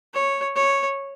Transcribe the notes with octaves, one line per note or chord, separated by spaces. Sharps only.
C#5
C#5